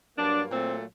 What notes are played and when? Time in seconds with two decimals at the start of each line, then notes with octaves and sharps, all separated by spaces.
0.17 G2 F#3 A#3 D4
0.50 A#2 F#3 A3 C4